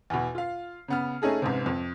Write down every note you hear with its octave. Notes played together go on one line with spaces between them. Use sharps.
E2 B2
F4 F5
C#3 B3 F6
A3 C#4 D#4 G#4 A4
A1 G#2 C3
F2